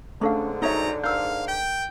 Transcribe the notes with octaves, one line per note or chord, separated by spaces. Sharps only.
G#2 D3 A3 C#4 D4 A4 F5
F#2 D#4 C#5 E5 A#5
A#4 F5 E6 G6
G5